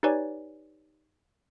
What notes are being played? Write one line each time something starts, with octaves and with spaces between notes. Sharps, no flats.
D#4 G4 B4 C#5 D5 G#5